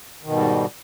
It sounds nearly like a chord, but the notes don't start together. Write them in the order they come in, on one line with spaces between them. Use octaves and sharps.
D#3 B2 G#2 G3